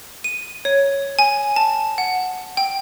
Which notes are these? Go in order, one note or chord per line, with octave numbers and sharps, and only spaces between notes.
D#7
C#5
G#5
A5
F#5
G5